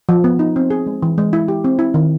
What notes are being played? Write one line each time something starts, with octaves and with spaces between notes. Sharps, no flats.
F3
B3
D#4
C4
G#4
G#3
E3
G#3
E4
G4
C4
E4
D#3